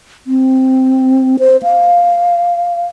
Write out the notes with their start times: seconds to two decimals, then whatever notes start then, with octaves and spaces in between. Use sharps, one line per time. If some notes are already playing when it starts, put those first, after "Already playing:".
0.27 C4
1.39 C5
1.63 F5